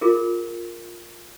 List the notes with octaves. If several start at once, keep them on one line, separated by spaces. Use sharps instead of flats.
F4 G#4 A#4